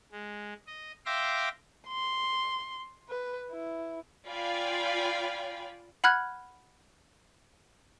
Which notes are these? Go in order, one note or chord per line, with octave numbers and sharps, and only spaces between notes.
G#3
D#5
E5 F5 G5 C6 D6 A#6
C6
B4
E4
F4 D5 F5 G5 G#5 B5
F#5 B5 F6 F#6 G#6